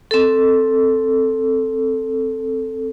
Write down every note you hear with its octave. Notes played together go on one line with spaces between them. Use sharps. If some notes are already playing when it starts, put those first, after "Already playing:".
C4 A4